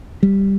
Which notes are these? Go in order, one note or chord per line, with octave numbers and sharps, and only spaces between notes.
G3